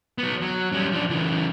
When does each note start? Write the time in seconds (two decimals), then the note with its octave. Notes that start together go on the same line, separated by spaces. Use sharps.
0.18 F#3 B3
0.42 F#3
0.72 G3 C#4
0.92 F3 D4
1.10 C#3 E3